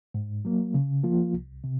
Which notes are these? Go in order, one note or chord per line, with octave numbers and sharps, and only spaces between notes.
G#2
F#3 A#3
C#3
F3 A#3 F4
C2
C3